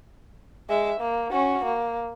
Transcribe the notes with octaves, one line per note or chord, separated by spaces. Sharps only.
G#3 E5
A#3
C#4 F#4
A#3